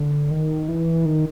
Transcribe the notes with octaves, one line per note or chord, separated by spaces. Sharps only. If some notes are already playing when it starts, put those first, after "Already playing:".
Already playing: D3
D#3
E3
D#3